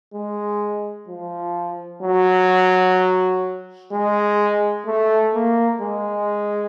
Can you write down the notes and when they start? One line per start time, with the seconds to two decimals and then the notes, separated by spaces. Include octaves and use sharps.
0.14 G#3
1.08 F3
2.02 F#3
3.92 G#3
4.86 A3
5.34 A#3
5.81 G#3